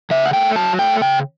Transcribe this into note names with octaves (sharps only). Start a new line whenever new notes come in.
C#3 E5
F#5
A3 G5
F#3 A5
A3 G5
C#3 G5